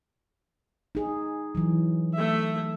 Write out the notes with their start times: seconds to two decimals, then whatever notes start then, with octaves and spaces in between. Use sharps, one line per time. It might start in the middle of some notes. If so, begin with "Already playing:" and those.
0.95 D#4 G#4
1.55 E3 F#3
2.14 A3 E5